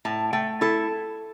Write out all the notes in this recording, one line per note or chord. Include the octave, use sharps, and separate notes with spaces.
A2 A5
A3 G5
E4 A4